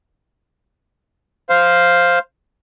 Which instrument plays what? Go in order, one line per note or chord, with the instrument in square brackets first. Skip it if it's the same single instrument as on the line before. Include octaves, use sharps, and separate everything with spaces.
[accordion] C5 F5